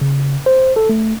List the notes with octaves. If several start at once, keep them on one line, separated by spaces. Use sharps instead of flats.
C#3
C5
A4
A3